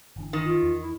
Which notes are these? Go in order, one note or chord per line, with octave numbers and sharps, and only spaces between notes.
G1 E3 D4
D#3
F4
E2
E4